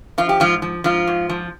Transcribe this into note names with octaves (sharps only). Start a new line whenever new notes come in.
F3 F4
G4
G#2 F3 F4
F3
G#2 F3 F4
G#2
F3